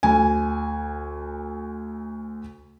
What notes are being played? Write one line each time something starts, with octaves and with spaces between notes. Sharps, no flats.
D2 G#5